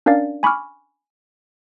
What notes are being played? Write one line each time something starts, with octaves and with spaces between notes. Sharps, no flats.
C#4 D4 A#4 D5 F5 A6
G#5 B5 C#6 D6 F6